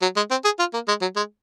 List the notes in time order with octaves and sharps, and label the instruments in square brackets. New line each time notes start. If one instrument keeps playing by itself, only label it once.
[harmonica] F#3
G#3
C4
G#4
F4
A#3
G#3
F#3
G#3